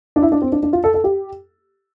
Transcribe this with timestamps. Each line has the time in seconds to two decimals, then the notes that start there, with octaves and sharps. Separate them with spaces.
0.16 D4
0.22 E4
0.32 D4
0.42 C4
0.52 D4
0.63 D4
0.73 F4
0.84 A4
0.94 A4
1.04 G4